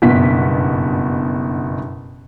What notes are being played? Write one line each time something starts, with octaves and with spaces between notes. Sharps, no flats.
F#1 G2 B2 B3 B6